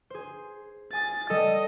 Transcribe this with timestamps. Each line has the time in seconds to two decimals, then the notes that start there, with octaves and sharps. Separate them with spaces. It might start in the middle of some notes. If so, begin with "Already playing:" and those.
0.10 G#4 C5
0.93 G#5 D#6 A6
1.30 G3 A4 D#5